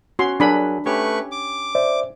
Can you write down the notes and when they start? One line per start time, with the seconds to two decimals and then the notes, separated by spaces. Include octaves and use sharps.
0.19 C#4 F#4 C6
0.40 F#3 D4 G#4 A#4 B5
0.86 A3 C#4 G4 B4 C#6
1.32 D6
1.75 C5 D5 E5